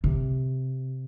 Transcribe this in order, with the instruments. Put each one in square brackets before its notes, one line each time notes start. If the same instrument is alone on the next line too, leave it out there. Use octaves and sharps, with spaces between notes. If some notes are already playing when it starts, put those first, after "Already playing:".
[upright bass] C3